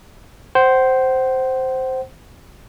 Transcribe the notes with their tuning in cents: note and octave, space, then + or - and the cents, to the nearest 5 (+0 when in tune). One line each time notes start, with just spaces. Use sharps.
C5 +0 F#5 +40